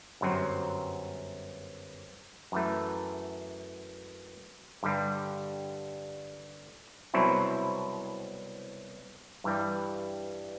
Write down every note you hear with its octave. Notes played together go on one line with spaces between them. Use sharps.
G1 F#2 F#3 C4
F#2 E3 A3
G2 D3 G3
C2 B2 F#3 C4 E4
G2 E3 G3